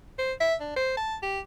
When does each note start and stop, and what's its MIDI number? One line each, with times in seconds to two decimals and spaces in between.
0.18 0.33 72
0.40 0.54 76
0.60 0.73 62
0.76 0.95 72
0.97 1.16 81
1.23 1.40 67